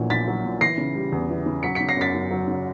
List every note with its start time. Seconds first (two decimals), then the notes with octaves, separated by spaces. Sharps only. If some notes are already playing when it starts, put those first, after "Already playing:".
Already playing: A#1 A#2 E3 F#3
0.10 A#1 A6 B6
0.27 F#3
0.45 A#2
0.61 E3 A#6 C7
0.78 C#3
0.95 G3
1.12 E2
1.30 E3
1.46 C#3
1.63 F#3 B6 C#7
1.75 B6 C#7
1.80 C#3
1.89 A#6 C7
1.97 F#2 A6 B6
2.14 F#2
2.31 F#3
2.48 C#3